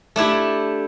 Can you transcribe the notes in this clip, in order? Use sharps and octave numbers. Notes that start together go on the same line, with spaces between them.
A3 D4 E4 G4